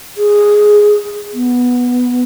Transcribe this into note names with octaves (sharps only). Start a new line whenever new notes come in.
G#4
B3